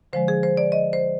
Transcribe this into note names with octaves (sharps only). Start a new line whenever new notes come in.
D3 F3 G#3 C5
G#4
C5
D5
D#5
C5